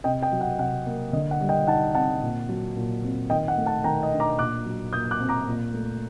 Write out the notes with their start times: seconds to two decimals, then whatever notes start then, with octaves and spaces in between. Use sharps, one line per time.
0.04 C3 D#5 G5
0.22 D#5 G5
0.32 F#3
0.41 F#5
0.59 C3 F#5
0.86 A#3
1.13 D3 D#5
1.31 F#5
1.40 G3
1.49 D#5 G5
1.67 D#4 F#5 A5
1.94 C4 F#5 A5
2.22 A#2
2.49 F#3
2.76 A#2
3.03 C4
3.30 D#3 D#5 G5
3.48 F#5
3.58 A3
3.66 F#5 A5
3.84 D#3 G5 A#5
4.03 D#5
4.12 D4
4.20 A#5 D6
4.39 A#2 D6 F#6
4.65 F#3
4.92 A#2 D#6 G6
5.11 D6 F#6
5.20 C4
5.29 A#5 D6
5.47 A#2
5.74 A3